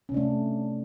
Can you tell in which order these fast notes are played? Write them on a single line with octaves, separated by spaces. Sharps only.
C#4 C3 D4 A3